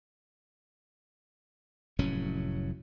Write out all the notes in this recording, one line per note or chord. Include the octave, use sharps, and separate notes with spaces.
F1 A2 F#3 C#4